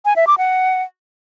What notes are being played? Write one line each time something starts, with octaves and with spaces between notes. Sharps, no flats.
G#5
E5
D6
F#5